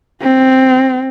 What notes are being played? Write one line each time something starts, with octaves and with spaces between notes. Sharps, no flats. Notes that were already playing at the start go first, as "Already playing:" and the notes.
C4